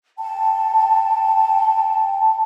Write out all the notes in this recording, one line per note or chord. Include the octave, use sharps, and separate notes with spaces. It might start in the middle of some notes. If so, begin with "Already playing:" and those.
G5 A5